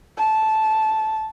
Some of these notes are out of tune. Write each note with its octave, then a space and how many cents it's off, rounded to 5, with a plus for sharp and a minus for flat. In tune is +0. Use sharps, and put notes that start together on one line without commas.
A5 -10